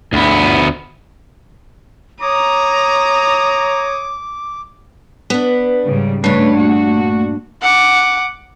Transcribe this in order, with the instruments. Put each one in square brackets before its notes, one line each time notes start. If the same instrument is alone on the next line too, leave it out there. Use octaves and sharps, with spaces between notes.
[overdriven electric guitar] D2 B3
[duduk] C#5 [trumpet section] A#5 [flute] D6 [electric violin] D#6
[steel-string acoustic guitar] B3 D4 [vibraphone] B4
[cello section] G#2 C#3 G3
[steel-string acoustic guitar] G2 D4 [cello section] C#3 B4 C#5 [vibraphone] A3
[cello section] A#2 F#4
[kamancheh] F#5 D6